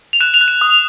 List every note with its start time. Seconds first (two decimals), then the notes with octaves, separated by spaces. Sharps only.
0.13 F7
0.21 F#6 E7
0.34 F7
0.41 F#6
0.48 E7
0.61 D#6